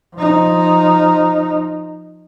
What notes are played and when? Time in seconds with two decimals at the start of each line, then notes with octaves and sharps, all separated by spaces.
0.15 F3 D#4